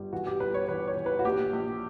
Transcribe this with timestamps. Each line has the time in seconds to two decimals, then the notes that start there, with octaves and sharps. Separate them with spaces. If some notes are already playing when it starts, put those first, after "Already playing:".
Already playing: G1 G3
0.13 E3 F#4
0.27 G4
0.40 G1 B4
0.54 C#5
0.68 E3 B4
0.87 C#5
0.97 E3
1.06 B4
1.19 F#4
1.25 A#1 G4
1.53 A#1